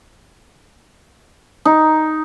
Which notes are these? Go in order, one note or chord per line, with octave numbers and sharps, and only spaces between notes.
D#4